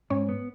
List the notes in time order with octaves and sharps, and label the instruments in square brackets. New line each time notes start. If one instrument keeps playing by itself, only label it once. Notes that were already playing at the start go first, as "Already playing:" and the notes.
[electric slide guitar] G#2 [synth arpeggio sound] C#4 C#5
[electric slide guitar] B3